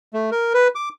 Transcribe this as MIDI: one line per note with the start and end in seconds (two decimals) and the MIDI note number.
0.14 0.30 57
0.31 0.53 70
0.54 0.68 71
0.75 0.89 86